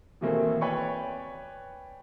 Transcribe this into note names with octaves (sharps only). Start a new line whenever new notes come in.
B2 D#3 E3 A3 A#3 C4
B4 C#5 D5 G5 G#5 C#6